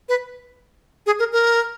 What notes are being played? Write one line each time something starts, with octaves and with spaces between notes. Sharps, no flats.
B4
G#4
A#4
A#4